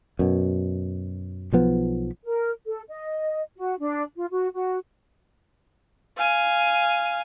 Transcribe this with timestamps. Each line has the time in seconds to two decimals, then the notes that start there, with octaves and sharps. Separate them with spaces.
0.19 F#2 B2
1.53 B1 F3 B3
2.25 A#4
2.67 A4
2.89 D#5
3.57 F#4
3.79 D4
4.16 F4
4.31 F#4
4.54 F#4
6.17 F5 G#5